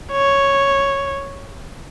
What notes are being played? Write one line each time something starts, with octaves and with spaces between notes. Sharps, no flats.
C#5